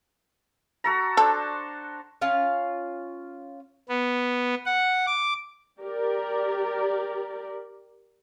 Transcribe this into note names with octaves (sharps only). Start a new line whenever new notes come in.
F#4 A4 A#5
D4 A4 C5
C#4 F4 F5
B3
F#5
D6
G4 A#4 D5